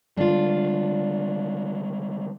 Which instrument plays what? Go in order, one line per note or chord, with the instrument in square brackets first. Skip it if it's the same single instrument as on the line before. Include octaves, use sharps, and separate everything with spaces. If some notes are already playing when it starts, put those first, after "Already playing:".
[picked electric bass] D3 G3 G#3 [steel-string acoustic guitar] D4 F4